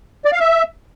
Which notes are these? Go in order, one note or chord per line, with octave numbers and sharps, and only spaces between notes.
D5
F5
E5